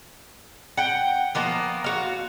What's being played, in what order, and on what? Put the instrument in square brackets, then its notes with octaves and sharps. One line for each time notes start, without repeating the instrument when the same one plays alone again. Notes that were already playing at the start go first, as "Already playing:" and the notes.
[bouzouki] F#5 G5
F3 A#3 B3
F#4 F5